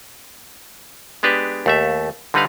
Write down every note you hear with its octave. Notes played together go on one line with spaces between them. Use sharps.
G#3 B3 D4 G4 B4
D#2 A3 E5
D3 G3 D#4 B4 F5